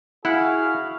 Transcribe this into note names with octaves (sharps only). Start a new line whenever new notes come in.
E4 F#4 G#4 F5 F#5